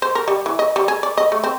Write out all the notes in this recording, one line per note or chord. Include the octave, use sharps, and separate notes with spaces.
C5
A#4
G3
E3
D#5
G3
G#4
D5
D#5
A3
C4